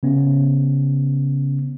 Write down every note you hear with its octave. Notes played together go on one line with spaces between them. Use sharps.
C#3 B3 C#4